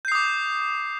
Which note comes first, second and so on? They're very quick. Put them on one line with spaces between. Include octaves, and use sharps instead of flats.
G6 C7 D#6 D6